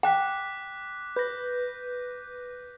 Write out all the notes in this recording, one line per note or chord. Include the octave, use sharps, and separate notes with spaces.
G5 D6 F#6 B6
B4 G6 A#6